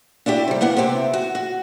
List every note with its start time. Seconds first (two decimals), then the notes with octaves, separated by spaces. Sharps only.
0.26 D4 E4 F#4 G4
0.48 C3 G3
0.61 A2 A#3 B3 F#5
0.77 C3 B3 C4 G4
1.14 F#4
1.35 F#4